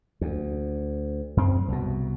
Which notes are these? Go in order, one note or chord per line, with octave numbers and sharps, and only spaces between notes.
D2
F#2 C4
C2 B2